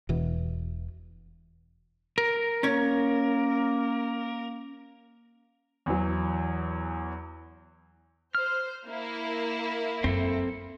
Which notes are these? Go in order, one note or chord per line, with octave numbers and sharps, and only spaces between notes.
E1 B2 E3
A#4
A#3 C#4 C#5
E2 E3 F#3
C5 F6
A#3 E4
F#2 C4 A4